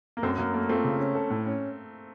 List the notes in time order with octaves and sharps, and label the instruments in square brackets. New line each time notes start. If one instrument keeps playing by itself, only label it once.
[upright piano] A#3
[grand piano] F#2 [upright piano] A3 C4
[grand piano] F#2 [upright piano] A#3
[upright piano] A3 [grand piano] A#3
[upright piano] A3 C4 [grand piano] F4
[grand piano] C#3
C#4
A4
A2
C#4